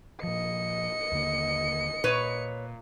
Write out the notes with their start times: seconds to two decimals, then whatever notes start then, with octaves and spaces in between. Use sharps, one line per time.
0.23 A#2 F3 D#5 C#7
1.12 D#2 D3 A#3
2.04 A#2 B4 C#5